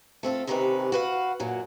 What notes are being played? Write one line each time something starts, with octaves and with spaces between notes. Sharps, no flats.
A3 C4 F4 A4
D#2 C3 D#3 C4 C#4 B4
F#4 B4 F5
F#2 A#2 F#3